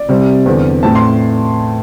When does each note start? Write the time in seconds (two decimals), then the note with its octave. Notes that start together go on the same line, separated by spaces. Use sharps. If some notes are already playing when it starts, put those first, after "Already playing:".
Already playing: D5
0.09 C3 G3 C4
0.46 E2 D3 C4
0.83 A2 A3 C4 A5
0.95 C6